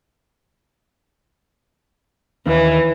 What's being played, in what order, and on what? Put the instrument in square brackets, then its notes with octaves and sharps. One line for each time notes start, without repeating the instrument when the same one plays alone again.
[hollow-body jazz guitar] D#2 [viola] E3